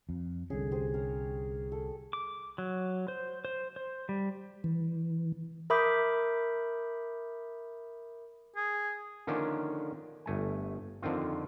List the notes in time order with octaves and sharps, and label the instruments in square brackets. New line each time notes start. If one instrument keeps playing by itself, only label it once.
[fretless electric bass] F2
[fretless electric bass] C2 D3 C#4 [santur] G#4 A4
[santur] G4 G#4 C5
A#4 C#5 A#5
A4
[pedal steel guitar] D6
F#3
C5
C5
C5
G3
[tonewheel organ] E3
[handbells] A#4 E5 B5 D6 D#6 G6
[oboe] G#4
[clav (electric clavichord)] D3 D#3 F3 A#3 C#4 D4
G1 A3 G#5
F2 D3 D#3 C4 F4